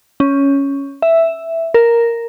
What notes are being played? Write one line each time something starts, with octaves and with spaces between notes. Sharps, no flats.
C#4
E5
A#4